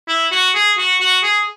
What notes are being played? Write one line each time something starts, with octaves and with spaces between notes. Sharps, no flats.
E4
F#4
G#4
F#4
F#4
G#4